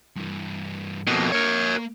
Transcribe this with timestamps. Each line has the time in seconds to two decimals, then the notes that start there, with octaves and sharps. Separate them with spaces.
0.16 G2 E3
1.07 F2 B2 A#3
1.32 A#4 C#5